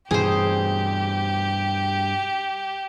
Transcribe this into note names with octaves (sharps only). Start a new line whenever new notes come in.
G2 B2 E3 G4 G#4 C5